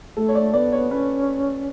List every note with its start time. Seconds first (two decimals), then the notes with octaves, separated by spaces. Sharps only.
0.17 A3 A4
0.28 C#5
0.35 D5
0.54 B3 D5
0.72 C#5
0.91 C#4 B4